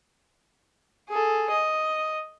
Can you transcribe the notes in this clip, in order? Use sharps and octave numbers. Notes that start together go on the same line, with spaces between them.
G#4 A4
D#5